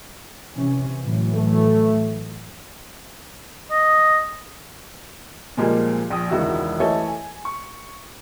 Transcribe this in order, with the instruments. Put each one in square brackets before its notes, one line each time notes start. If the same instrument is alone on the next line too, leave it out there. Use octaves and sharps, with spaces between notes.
[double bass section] C3 E3 C#4
A2 E3 F#3
[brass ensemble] A3
[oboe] D#5
[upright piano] A#2 F3 G3 G#3 A#3
A#1 G5 D#6
E1 C#2 D#3 E4 F#4 E6
E3 A3 E4 A4 C#5 D#5
G#5
C#6